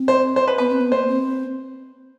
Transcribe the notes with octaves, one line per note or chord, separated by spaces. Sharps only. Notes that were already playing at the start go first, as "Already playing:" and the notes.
Already playing: C4
C5
C5
B4
B3 B4
C4
B3
A#3 C5
C4